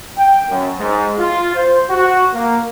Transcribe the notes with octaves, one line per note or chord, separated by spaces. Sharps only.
G5
F#2
G#2
F4
C5
F#4
A#3